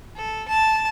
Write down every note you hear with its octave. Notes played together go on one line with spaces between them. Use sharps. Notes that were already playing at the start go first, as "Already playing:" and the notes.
A4
A5